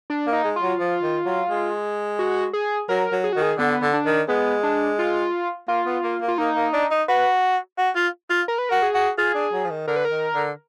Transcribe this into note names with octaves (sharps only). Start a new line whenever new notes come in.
D4
A#3
D#4
G#3
F4
F#3
F3
D#3
F#3
G#3
F#4
G#4
F#3 A#4
F#3
G#4
D#3 F#4
G#4
D3 B3
D3
D4
D#3
G#3 B3
D4
F4
A#3 F4
B3
A#3
A#3
F4
A#3 D#4
A#3
D4
D#4
F#4 B4
F#4
F4
F4
A#4
B4
F#4 A#4
G#4
F#4
F4 G#4
D4
F#3
F3
D#3
D3 A#4
B4
A#4
D#3
D3